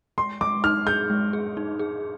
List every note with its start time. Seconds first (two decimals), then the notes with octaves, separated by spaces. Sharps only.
0.18 G#3 C6
0.41 G#3 D6
0.64 D#4 F6
0.87 G#4 G6
1.10 G#3
1.33 G#4
1.57 D#4
1.79 G#4